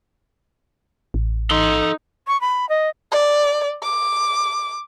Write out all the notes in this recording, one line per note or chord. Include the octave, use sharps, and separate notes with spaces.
A1
D#4 A4 C6
C#6
B5
D#5
D5
D6